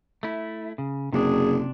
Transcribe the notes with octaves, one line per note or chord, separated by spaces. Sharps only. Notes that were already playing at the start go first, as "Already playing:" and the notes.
A3 E4
C#3
F#1 C3 D4 G#4